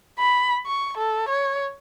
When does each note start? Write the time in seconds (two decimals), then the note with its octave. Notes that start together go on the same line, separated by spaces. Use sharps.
0.19 B5
0.66 C#6
0.97 A4
1.29 C#5